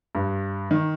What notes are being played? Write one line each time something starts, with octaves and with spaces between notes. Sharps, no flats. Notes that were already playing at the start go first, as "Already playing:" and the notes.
G2
D#3